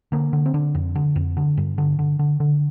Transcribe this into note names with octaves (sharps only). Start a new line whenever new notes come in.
D3 A#3
D3
C4
D3 D4
F2
D3
F2
D3
G2
D3
D3
D3
D3